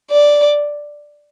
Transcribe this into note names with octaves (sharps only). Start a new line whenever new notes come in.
D5